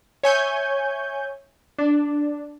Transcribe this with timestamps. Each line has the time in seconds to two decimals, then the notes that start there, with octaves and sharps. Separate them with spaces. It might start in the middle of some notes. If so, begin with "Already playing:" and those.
0.23 C#5 E5 G#5 C#6 G6
1.78 D4